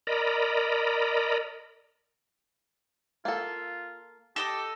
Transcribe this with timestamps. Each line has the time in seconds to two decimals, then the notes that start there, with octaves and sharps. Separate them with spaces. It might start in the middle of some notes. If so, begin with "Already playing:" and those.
0.07 A#4 D5 D#5 A#5 B5
3.25 A#3 F4 A4
4.36 G4 A4 D#5 D#6